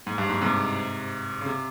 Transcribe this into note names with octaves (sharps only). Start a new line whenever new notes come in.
G#2
G2
G#2
G#2 C3
C#3
C3